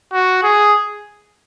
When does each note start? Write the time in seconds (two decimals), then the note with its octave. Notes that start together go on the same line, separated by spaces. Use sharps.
0.13 F#4
0.43 G#4